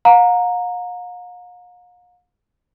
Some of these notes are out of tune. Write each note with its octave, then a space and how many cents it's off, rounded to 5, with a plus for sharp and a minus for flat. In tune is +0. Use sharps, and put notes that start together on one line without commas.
F5 +45 A#5 +0